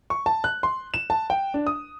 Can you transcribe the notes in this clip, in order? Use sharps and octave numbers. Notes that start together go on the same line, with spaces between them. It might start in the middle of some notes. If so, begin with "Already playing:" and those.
C#6
A5
F#6
C6
E7
A5
G5
D4
D#6